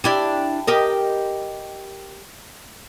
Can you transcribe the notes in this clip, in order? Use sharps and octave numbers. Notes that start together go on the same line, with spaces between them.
D4 E4 G4
G4 A#4 D#5